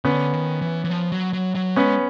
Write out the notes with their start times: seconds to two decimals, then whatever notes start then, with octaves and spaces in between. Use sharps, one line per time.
0.05 D3 B3 C#4
0.33 D#3
0.62 E3
0.84 E3
0.90 F3
1.12 F#3
1.34 F#3
1.55 F#3
1.76 G#3 B3 C#4